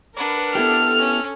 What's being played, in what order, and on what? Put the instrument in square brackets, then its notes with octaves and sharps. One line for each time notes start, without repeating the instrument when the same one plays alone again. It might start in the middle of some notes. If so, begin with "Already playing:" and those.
[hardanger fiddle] D4 F#5 [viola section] A#4 B4
[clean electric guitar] B3 E4 G4 [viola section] A4 [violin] F6
[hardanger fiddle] C#4